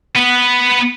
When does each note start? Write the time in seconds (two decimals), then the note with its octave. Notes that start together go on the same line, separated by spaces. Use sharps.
0.16 B3 B4